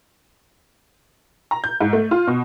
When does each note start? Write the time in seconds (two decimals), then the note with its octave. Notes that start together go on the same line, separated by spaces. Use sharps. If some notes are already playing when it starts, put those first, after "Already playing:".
1.51 A#5
1.64 G6
1.81 G#2
1.93 A3
2.11 F4
2.27 B2